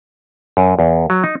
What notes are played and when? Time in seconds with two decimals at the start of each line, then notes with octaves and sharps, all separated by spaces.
0.57 F#2
0.79 E2
1.10 F#3
1.24 D#4